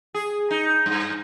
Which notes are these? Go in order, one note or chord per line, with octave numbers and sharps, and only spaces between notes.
G#4
D#4
G2